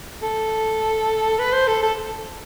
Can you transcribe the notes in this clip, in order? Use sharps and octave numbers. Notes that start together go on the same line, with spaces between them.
A4
B4
C5
A4
A4